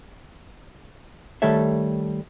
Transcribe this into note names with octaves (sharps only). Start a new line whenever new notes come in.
D#3 G3 A3 A4 C#5 E5